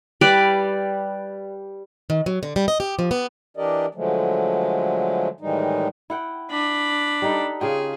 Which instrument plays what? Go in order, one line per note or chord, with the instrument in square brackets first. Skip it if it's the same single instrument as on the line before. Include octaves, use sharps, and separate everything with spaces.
[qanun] G3 B4 D5
[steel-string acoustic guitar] D#3
F#3
D3
G3
D#5
G4
F3
B3
[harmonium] E3 D4 G4 A#4 D5 D#5
D3 F3 F#3 G#3 A3
A2 D#3 E3 G3 G#3 D#4
[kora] E4 F#5 G5
[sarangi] D4 [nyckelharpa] B5
[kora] G3 D#4 A4
[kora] C#3 F4 G4 [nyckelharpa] G#4